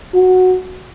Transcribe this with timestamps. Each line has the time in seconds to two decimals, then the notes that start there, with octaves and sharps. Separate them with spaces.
0.14 F#4